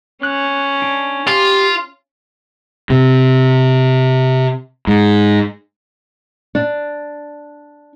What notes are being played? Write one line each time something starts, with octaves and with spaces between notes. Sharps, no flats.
C#4 F#6
D4
F4 G4
C3
G#2
D4